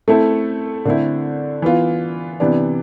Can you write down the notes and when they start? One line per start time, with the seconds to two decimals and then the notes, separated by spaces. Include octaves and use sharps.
0.08 A3 C4 E4 A4
0.85 D3 A3 C4 E4
1.62 E3 B3 F4
2.40 C3 E3 B3 D4